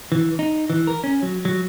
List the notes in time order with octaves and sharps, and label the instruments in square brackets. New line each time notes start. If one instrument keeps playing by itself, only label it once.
[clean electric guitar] E3
D#4
E3
A#4
C#4
F#3
F#3